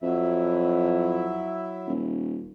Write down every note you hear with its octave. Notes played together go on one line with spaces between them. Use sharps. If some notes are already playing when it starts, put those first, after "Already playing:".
F2 F#3 E4 E5
D#1